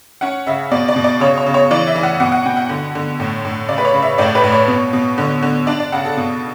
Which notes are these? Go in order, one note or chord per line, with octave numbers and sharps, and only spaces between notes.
C#4 F#5
C#3 E5
B2 D5
D5
B2
D5
C#3 C#5
C#5
C#3
C#5
E3 D5
E5
E3
F#5
B2 F#5
F#5
B2 G5
F#5
D3
D3
A2
A2
C#3 D5
B4
C#5
C#3
E5
A2 D5
B4
A2
C#5
B2
B2
D3
D3
D4 D5
D5
C#3 F#5
A4
B2